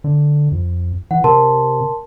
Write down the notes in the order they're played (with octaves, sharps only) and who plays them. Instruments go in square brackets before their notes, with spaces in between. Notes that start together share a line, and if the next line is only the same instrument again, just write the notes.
[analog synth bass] D3
F2
[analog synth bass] E3 [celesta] F#5
[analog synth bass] C3 [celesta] A#4 A5 C6